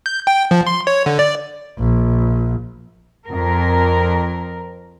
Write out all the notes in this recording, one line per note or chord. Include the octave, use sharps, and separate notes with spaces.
G6
G5
F3
C6
C#5
D3
D5
A#1
F2 A#4